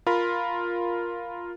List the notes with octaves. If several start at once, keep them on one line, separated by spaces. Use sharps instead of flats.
F4 A#4 B5